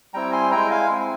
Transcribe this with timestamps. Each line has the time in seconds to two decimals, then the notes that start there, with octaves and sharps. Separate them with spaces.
0.14 G3 C4 E4 G5 A#5
0.32 G#5 C6
0.51 G#3 E4 G5 A#5
0.71 F5 G#5
0.90 G#3 C4 E4